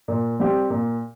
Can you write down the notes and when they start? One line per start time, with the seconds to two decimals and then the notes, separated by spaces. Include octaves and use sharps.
0.08 A#2
0.40 G3 C4 G4
0.70 A#2